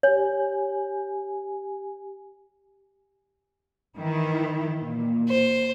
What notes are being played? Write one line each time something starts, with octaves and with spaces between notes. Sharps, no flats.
G4 C#5 G#5
D#3 E3 E4
A#2
C5